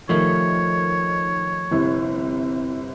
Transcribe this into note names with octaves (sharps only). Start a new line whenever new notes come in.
D#3 F3 A3 C#5
G1 C3 E4